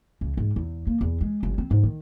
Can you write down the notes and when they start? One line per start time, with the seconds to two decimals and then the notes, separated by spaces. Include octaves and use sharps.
0.21 C#2
0.37 G#2
0.56 E2
0.87 A#3
1.01 E2
1.21 G#3
1.43 G1
1.58 C4
1.71 G#2
1.83 D#3